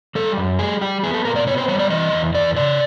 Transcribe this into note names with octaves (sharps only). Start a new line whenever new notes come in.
G3 A4
F#2
G3 G#4
G3 G4
B3 G#4
A4
A#2 A#4
D5
B3 C#5
C5
G3 C#5
D5
E3 D#5
E2
E2 D5
C#3 D5